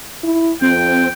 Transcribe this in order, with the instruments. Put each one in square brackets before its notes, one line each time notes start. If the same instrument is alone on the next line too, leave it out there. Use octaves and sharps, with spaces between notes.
[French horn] E4
[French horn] F2 [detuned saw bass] C4 [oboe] G5